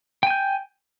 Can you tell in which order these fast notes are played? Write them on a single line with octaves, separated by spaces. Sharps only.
G5 G#5 G6